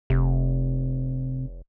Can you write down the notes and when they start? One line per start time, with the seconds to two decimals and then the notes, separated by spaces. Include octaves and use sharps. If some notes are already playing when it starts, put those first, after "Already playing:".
0.10 F1 C3